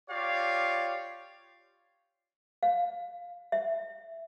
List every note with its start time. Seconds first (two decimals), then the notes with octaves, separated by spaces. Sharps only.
0.10 F4 G4 C#5 D5 F5
2.63 F5
3.52 E5